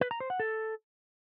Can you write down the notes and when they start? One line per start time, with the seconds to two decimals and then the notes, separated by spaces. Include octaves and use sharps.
0.01 B4
0.11 A#5
0.20 C5
0.30 F#5
0.40 A4